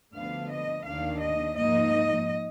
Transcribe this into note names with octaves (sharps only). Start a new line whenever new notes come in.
D2 D3 F3 B3 D4 F5
D#5
D#2 D#3 A#3 D4 F5
D#5
G#2 F3 A#3 D#4 D#5